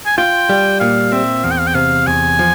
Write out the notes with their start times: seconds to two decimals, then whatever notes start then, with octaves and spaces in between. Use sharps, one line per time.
0.06 G#5
0.18 F4 G5
0.49 G3
0.80 A#2 F5
1.12 C4 E5
1.44 E2 F5
1.51 G5
1.59 F5
1.67 G5
1.75 C3 F5
2.07 E2 G#5
2.39 F3